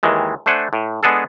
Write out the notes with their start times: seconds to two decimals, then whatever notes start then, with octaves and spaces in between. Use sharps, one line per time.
0.03 D#2 D#3 E3 G#3
0.46 A3 D4 C5 F#5 G#5
0.73 A2
1.03 G#3 B3 D4 G#4 A4